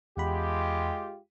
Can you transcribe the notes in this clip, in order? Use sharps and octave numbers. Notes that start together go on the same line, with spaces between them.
E2 G#3 F4 G4 F#5 B5